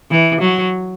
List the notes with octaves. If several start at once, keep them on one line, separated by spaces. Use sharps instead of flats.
E3
F#3